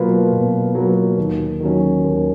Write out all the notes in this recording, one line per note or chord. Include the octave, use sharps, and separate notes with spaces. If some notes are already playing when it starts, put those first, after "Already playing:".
Already playing: B2 F#3 A#3 F4 B4
B2
F#3 A#3 F4 B4
D#2
D#3 F#3 C#4
D#2